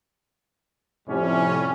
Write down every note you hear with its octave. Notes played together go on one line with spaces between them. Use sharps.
F2 A2 C3 G3 C#4